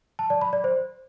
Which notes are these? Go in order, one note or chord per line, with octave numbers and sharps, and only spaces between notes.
A5
D5
B5
D5
C5